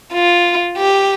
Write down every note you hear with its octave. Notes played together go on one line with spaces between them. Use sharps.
F4
G4